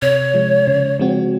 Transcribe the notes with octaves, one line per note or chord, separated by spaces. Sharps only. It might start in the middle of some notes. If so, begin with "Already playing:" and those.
C3 C#5
F3 G#3
C#3
F3 G#3 C4 F#4